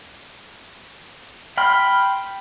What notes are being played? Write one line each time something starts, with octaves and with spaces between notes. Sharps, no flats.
G5 B5 C6 F6